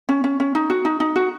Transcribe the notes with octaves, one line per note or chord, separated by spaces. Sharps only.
C#4
C#4
C#4
D#4
F#4
D#4
D#4
F#4